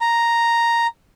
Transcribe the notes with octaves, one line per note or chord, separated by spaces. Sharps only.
A#5